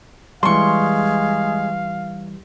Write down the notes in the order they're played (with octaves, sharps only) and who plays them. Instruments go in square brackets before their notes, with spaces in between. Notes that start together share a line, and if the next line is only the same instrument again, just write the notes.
[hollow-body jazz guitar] E3 G3 [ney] G#3 [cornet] F5 [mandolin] C6 C#6